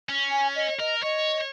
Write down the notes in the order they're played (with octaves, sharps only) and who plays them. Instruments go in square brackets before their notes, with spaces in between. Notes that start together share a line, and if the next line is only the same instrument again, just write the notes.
[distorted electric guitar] C#4
[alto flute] G#5
D#5
[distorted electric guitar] A#4 [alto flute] D#5
[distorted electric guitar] C#5 [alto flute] D#5